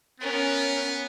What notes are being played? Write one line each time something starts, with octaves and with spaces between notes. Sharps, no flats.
B3 C#4 A#4